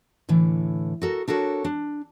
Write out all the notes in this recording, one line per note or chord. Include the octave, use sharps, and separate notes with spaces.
A2 D3 E3
F#4 A4 A#4
D4 F#4 A4 A#4 C#5
D4